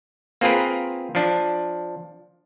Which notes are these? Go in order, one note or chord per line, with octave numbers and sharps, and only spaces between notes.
A#3 C4 F4 G#4 A#4 B4
F3 D4